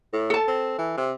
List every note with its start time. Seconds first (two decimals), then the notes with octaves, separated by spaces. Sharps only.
0.13 A2
0.30 A4 A5
0.48 C4
0.78 E3
0.97 C3